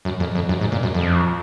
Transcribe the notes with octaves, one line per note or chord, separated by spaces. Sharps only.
F#2
F2
F2
F#2
G#2
A#2
F#2
F2